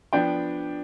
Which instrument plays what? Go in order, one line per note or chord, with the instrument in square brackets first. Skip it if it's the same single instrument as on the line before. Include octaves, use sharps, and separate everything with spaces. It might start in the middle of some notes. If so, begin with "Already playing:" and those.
[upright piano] F3 B3 D4 G5